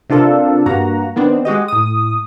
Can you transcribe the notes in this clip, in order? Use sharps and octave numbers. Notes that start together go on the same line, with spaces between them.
C3 D4 F4 A4 A#4
G2 A#3 F#4 A#5
D#3 B3 C4 D4
G#3 F#4 G4 D#5
A2 D#6